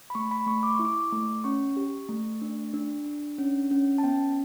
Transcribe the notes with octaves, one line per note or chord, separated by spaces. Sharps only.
B5
A3 C#6
B5
A3 C#6
D6
E4 C#6
D6
A3
C#4 C#6
G4
A3
D4
D4
D4
C#4
C#4
A5
B3 G5